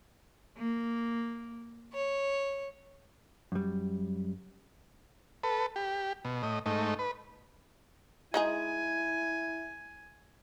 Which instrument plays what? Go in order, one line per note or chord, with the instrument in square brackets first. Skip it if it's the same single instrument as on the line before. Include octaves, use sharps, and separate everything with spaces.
[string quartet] A#3
C#5
[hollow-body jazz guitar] F#2 G3
[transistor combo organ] A4 B4
G4
B2
A2 D#5
G#2 A3 D#4
B4
[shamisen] G#3 D#4 G#4 [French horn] E4 [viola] G#5